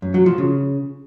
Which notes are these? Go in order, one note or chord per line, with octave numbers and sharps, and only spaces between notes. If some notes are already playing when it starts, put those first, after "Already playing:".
F#2
F#3
F3
C#3